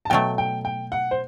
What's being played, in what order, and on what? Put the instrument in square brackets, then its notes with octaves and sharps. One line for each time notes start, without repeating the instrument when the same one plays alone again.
[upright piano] A5
[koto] B2 F#3 A3 [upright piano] G5
[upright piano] G5
G5
F#5
C5